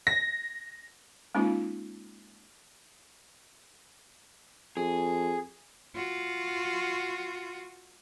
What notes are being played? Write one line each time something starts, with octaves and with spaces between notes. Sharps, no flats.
A#6
G#3 A#3 C#4 D#4 F4
F2 G#4
F4 F#4